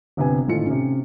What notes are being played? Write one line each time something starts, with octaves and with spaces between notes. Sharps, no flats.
G1 C3 B3 G#5
G#1 A2 D#4 F4 A4 C#7
C3 C#4